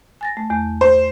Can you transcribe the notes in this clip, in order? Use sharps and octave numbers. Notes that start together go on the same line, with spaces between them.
G#5 A6 A#6
A3
E2 A3
C5